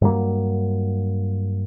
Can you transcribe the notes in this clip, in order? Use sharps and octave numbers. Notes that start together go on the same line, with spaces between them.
G2 F#3 A#3